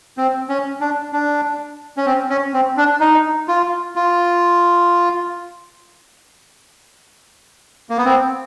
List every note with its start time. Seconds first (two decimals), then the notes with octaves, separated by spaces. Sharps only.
0.18 C4
0.49 C#4
0.81 D4
1.13 D4
1.97 C#4
2.06 C4
2.30 C#4
2.54 C4
2.77 D4
3.00 D#4
3.48 F4
3.95 F4
7.90 A#3
7.97 B3
8.05 C4